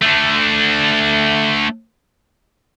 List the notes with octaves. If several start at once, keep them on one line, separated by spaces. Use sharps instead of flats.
A3 D4